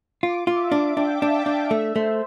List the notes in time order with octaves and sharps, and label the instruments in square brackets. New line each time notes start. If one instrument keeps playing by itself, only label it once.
[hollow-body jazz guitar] F4 [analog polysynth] D6
[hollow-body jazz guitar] F4
[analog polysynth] E5
F5
[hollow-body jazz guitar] D4
[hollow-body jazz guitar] D4 [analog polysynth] G5
[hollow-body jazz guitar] D4 [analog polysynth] A5
[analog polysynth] G5
[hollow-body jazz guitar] D4
[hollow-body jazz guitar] A3 [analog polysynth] E5
[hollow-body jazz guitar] A3 [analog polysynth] C5